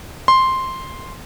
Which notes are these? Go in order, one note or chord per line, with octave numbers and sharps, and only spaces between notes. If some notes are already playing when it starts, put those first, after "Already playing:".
C6